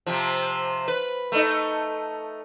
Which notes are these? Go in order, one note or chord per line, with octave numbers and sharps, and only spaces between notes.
C3 F3
B4
A3 D#4